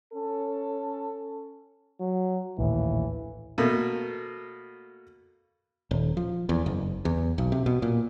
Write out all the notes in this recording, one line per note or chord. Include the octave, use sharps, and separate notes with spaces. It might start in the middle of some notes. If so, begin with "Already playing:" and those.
C#4 A4
F#3
A#1 D#2 A2 E3
B2 A3 A#3
D#1
F3
E2
F#1
E2
B1
C3
B2
A#2